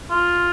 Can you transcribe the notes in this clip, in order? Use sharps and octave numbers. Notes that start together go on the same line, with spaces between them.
F4